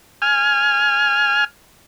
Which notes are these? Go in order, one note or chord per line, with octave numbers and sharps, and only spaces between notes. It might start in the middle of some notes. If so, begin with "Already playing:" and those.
G#5 F6